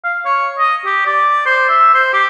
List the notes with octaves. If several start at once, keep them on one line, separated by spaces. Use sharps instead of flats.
F5
C#5
D#5
G4
D5
C5
E5
C5
G4